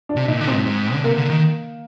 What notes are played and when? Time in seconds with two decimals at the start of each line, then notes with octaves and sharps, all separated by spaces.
0.09 D4
0.16 C3
0.28 A#2 D#4
0.41 D3
0.47 C4
0.53 G#2
0.66 G#2
0.94 D3
1.04 C3 A#3
1.17 D3
1.30 D#3